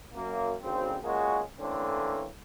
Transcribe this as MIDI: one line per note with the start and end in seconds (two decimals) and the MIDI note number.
0.13 0.53 42
0.13 0.53 58
0.62 0.95 32
0.62 0.95 38
0.62 0.95 49
0.62 0.95 60
1.03 1.41 46
1.03 1.41 56
1.03 1.41 58
1.03 1.41 61
1.03 1.41 66
1.03 1.41 68
1.59 2.26 50
1.59 2.26 52
1.59 2.26 57
1.59 2.26 58
1.59 2.26 60
1.59 2.26 61